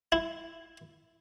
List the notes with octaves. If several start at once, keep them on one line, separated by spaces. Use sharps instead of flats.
E4